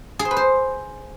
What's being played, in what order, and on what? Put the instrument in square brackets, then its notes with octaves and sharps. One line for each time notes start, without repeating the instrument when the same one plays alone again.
[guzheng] G#4
C5
B4
C5